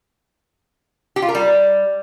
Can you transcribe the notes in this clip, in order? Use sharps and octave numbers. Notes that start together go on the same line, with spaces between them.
G4
F4
A#4
G3